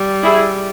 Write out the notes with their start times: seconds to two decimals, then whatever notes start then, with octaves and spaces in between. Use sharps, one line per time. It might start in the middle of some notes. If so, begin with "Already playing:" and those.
Already playing: G3
0.23 E4 G#4